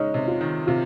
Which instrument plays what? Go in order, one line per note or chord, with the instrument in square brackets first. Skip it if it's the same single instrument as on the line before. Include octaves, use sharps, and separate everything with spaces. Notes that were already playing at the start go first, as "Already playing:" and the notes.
Already playing: [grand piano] G#3 C#4 [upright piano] D#4
[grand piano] C3
[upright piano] F4
[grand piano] D#3
[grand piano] C3 [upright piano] F4